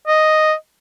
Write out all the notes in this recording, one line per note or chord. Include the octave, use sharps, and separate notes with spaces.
D#5